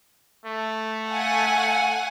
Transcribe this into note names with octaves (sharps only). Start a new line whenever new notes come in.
A3
F5 F#5 G#5